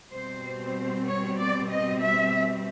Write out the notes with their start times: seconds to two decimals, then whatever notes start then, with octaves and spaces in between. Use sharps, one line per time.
0.12 B2 G3 C4 C5
0.59 C5
1.07 C#5
1.39 D5
1.70 D#5
2.01 E5